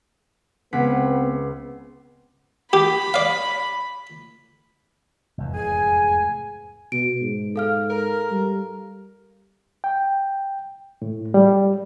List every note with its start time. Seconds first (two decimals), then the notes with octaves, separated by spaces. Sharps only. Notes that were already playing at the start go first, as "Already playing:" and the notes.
0.73 C#2 B3 C4 F#5 B6
2.73 G4 B5
3.14 D5 F5
5.38 F1 E2 G#2
5.54 G#4 G#5
6.92 B2 D7
7.21 G#2
7.56 A4 F5 F6
7.90 A#4
8.30 G3
9.84 G5
11.02 A2
11.34 G3